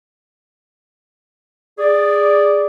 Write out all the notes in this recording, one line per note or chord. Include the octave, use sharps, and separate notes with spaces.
G#4 D5